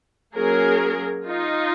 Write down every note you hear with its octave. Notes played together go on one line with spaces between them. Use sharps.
F#3 A#3 C#4 G#4 A#4
D#4 F4